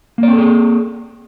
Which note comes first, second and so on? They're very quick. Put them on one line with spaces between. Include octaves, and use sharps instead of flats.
A#3 D5 C4 A4 G#4